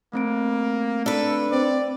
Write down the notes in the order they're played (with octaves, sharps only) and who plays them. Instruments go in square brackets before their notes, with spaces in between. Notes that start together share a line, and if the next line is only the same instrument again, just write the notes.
[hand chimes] A3 C4 D7 [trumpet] A#3
[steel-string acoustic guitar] D4 B4 [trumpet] A4
[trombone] C4 [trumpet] D5